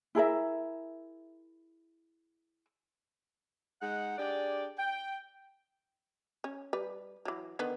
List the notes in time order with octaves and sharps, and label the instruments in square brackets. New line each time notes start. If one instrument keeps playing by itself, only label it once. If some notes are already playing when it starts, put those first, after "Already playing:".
[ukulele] E4 G#4 A#4 E5
[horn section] G#3 D#4 F#5
D4 G4 G#4 D5
G5
[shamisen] C#4
G3 B4
E3 F#3
D3 D#3 B3